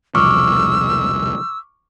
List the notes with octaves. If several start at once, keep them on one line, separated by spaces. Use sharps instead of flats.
E1 C2 F3 C#6 D6 E6 F6